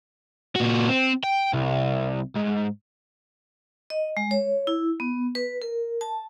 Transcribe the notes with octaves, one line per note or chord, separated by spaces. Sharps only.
A#2 F#4
C4
G5
C2
G#2
D#5
G#3
C#5
E4
B3
B4
A#4
A5